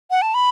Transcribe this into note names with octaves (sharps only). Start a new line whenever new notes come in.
F#5
A5
B5